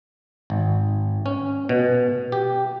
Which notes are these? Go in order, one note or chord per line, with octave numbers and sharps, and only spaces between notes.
G#1
C#4
B2
G4